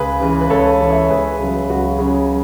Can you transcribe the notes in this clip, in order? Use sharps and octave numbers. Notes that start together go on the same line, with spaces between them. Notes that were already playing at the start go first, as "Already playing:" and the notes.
Already playing: C#2 G#4 B4
C#3 E3
B4
C#2 A4 C#5
C#3 E3
C#5 E5
C#2 G#4 B4
C#3 F#3
C#2 F#4
C#3 F#3